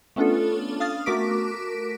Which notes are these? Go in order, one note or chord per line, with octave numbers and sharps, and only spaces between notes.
A3 B3 C#4 D4 F4 A4
F5 D#6 F6 A6
A3 F#4 A#4 D6 B6 D7